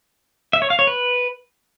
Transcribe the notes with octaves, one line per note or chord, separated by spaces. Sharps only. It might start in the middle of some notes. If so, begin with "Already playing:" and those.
E5
C#5
F5
C#5
B4